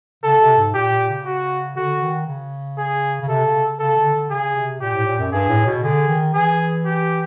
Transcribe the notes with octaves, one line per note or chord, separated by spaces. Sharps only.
C#3 A4
C3
G#2
A#2 G4
A#2
C#3
F#4
D3 F#4
D#3
C#3
G#4
C#3
C3 A4
C#3
C#3 A4
D3
D3
C#3 G#4
C3
A#2 G4
A2
A#2
F#2
G2 G#4
A2
B2
D3 G#4
D#3
E3 G#4
G4